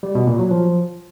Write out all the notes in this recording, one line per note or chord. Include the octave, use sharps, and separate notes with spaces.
G3
B2
A#2
F#3
F3